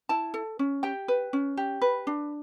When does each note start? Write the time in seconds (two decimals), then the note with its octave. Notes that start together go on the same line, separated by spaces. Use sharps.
0.09 E4 A5
0.34 A4
0.59 C#4
0.83 G4 G5
1.08 B4
1.33 C#4
1.57 G4
1.82 B4
2.07 D4